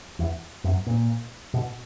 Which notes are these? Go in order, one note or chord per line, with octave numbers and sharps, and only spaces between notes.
E2
F#2
A#2
B2